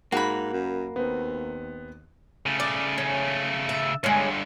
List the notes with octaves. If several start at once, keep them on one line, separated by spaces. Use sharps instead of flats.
G#2 A#3 F#4 B5
F#2
D#2 B3 C4
C#3 A3
D5
C#4
E5
G2 D3 G#3 C#4